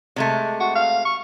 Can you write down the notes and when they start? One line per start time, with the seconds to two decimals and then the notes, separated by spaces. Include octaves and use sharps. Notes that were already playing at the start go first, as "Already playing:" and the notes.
0.16 C3 G#3 A3
0.60 F#4
0.75 F5
1.05 C#6